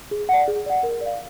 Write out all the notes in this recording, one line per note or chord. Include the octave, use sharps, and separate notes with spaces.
G#4
D5 F#5
G#4
D5 F#5
A#4
D5 F5